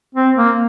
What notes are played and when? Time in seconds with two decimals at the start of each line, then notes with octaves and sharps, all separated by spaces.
0.15 C4
0.36 A#3